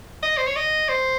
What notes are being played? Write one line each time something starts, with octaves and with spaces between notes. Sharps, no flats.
D#5
C5
C#5
D#5
C5